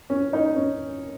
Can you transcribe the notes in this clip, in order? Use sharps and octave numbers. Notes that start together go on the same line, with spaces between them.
C#4
D#4
C#4